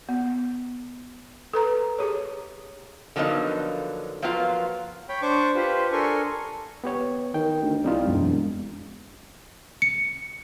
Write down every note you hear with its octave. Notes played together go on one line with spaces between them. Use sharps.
B3
A4 B4 A#5
G4 G#4 C#5
D3 F3 F#3 A#3 B3 D#4
F3 F#3 A#3 B3 F4 F5
C#5 G5 B5
D4 C5 C#6 D6
F4 G4 B4 C5
D4 A4 A#4 G#5 C6 C#6
B3 G4 C#5
D#3 G5
D2
C2 G3 D#4 F4
E1 F#2
C#7